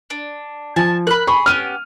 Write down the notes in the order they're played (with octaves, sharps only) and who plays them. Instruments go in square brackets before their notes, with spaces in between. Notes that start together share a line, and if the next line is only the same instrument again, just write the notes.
[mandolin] D4
[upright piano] F3 [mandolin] G#5 A5
[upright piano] A#4 [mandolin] B5 F#6
[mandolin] G#4 [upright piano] B5 C#6
[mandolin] B3 C#4 G4 [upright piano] F6 D#7